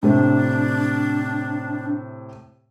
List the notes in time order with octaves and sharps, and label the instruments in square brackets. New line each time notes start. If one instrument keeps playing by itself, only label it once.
[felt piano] A2 C3 C4 [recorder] D4